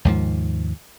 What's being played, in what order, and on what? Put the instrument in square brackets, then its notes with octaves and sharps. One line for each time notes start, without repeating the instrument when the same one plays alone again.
[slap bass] D#2 G#2 F3